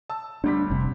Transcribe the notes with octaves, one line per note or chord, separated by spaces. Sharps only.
A5 E6
D2 G3 D4 B6
F1 C3